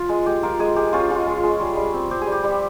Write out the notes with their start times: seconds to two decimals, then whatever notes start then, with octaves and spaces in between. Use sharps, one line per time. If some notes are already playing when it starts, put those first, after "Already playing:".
Already playing: F4
0.09 G#3
0.26 G#3 G4
0.43 F4 A#4
0.60 G#3 G#4
0.76 G#3 G4
0.93 C#4 F4
1.10 G#3 F4
1.27 G#3
1.44 G#3
1.60 G3
1.77 G3
1.94 C4
2.11 C4 G4
2.21 G#4
2.27 G3
2.32 G4
2.44 G3